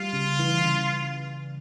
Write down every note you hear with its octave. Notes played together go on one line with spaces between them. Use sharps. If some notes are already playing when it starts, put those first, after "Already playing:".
Already playing: G3 F4
C#3
E3
C#3